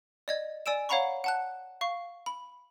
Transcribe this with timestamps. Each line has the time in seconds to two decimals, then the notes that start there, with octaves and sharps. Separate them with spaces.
0.28 D5 D#5 G#6
0.66 D5 G#5 E6 D7 E7
0.89 C#5 F5 F#5 A#5 B5 C#6
1.24 F#5 A5 F#6
1.81 F5 C#6
2.26 B5